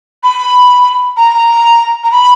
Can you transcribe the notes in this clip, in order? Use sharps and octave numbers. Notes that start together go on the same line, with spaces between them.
B5
A#5
A#5
B5